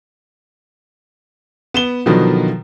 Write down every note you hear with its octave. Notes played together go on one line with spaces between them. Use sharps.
B3 E7 G7
B2 D3 D#3 F3 F#3